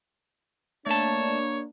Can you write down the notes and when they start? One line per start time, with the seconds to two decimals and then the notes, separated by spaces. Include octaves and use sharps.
0.86 A3 A#3 D4 C#5 A5